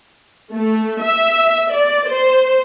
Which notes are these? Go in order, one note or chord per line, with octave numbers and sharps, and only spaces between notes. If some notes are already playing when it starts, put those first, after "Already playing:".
A3
E5
D5
C5